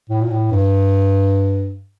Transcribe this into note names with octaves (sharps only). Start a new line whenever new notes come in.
A2
A#2
A2
G2